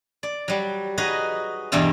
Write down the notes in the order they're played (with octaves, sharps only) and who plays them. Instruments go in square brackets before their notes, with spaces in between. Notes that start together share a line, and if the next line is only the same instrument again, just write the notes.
[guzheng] D5
F#3 G3
D#4 F#4 G#4 B4 D#5
E2 G2 B2 G3 E4 F4